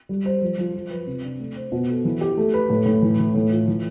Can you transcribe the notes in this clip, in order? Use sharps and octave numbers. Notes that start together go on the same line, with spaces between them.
G3
C5
F3
F3
F3
B4
C3
D4
A3
C5
B2
A4
E3
G4
A3
B4
A2
A2
E3
E3
A2
F4
E3